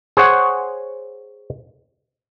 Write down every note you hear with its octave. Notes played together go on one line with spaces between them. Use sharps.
G#4 C5 C#5 F#5 G#5